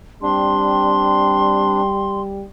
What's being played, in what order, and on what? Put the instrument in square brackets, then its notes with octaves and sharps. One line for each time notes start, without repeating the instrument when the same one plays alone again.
[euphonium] G3 [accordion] C4 D4 [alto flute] C6